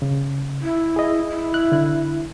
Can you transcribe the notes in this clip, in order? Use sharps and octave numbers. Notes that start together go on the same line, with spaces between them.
C#3
E4
G#4 D#5
E4
F#6
D3 F#6